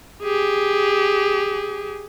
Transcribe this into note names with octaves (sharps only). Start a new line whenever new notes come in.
G4 G#4